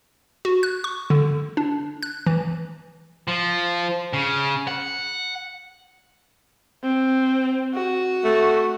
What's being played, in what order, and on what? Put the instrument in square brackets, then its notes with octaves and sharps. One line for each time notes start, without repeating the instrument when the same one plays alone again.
[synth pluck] F#4
F#6
C#6
D3
D4
F#6
E3
[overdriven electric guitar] F3
C#3
F#5
[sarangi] C4
F#4
[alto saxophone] A3